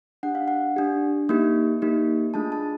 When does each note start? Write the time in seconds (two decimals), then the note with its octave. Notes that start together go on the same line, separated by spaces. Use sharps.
0.23 D4 G4 F#5
0.35 F5
0.48 F#5
0.76 D4 G4
1.29 A#3 D#4 G4
1.82 A#3 D#4 G4
2.34 A3 D4 F4 G#4 A5
2.52 A5